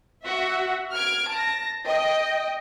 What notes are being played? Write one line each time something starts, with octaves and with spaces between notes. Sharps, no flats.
F#4 E5
F6 G#6 D7
A5 A#6
D#5 G5